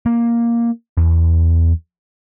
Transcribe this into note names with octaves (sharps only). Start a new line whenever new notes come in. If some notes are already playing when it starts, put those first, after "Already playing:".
A#3
E2